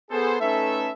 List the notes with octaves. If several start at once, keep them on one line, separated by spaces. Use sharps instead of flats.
B3 G#4 A4 C5
A3 C#4 D#4 A4 B4 E5